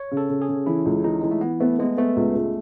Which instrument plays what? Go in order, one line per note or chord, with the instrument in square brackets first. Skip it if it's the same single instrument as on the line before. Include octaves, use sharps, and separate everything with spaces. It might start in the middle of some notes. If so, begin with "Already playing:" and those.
Already playing: [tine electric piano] C#5
[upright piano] C#3
[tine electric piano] A4
[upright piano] C#3
[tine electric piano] G#4
[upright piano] C#3
[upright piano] E3 [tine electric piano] E4
[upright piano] C#2
[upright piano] E3 [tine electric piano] D#4
[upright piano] E3 [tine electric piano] G#3
[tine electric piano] A3
[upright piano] E3 [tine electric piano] B3
[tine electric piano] A3 [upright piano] B3
[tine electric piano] G#3 [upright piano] B3
[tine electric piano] A3 [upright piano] B3
[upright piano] C#2
C#2